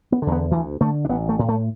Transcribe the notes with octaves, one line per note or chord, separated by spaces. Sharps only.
B3
E2 D3
B3
D2 E3
D3 A3
D4
A1 B3
A3
A2
A3